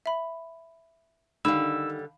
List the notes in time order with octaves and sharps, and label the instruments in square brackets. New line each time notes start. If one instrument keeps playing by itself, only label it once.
[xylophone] E5 B5
[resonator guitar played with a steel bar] D3 G3 [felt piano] D#3 [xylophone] F5 B5 [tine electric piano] E6